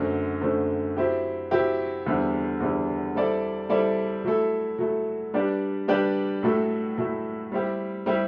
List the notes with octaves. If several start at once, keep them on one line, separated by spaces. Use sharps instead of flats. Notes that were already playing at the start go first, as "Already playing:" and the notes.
Already playing: F#2 D3 A3 C4
F#2 D3 A3 C4
F#3 C4 E4 G4
F#3 C4 E4 G4
E2 D3 G3 C4 E4
E2 D3 G3 C4 E4
G3 C4 E4 A4 D5
G3 C4 E4 A4 D5
F#3 A3 E4 A4
F#3 A3 E4 A4
G3 D4 G4 B4 D5
G3 D4 G4 B4 D5
A2 F#3 A3 E4 A4
A2 F#3 A3 E4 A4
G3 C4 E4 G4
G3 C4 E4 G4